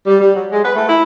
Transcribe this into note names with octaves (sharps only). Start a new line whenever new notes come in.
G3
G3
F#3
G#3
B4
A3
E4